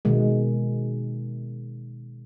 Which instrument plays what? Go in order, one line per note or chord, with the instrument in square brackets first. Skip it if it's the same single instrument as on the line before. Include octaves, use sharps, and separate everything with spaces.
[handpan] B2 D#3 G#3